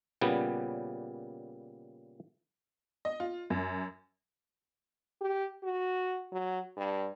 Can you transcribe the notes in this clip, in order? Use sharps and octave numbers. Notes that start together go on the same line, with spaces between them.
A#2 C#3 G3 B3
D#5
F4
F#2
G4
F#4
F#3
G2